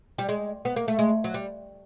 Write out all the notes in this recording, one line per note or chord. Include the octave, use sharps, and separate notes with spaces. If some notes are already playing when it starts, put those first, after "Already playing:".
G3
G#3
B3
A#3
A3
G#3
F#3
G3